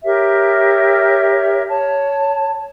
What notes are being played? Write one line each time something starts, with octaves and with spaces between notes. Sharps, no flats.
G4 A#4 C#5 E5
C#5 A5